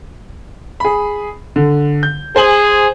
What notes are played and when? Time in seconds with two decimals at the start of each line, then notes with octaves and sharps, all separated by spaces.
0.80 G#4 B5
1.56 D3
2.03 G6
2.36 G#4 C5 G#5 F#7